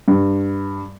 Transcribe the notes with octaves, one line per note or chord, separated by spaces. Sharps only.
G2